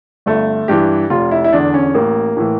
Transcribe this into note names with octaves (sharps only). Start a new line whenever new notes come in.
G1 A3
G2 E3 G4
F1 F4
E4
E4
E2 D3 D4
C#4
A1 A#3
A2 E3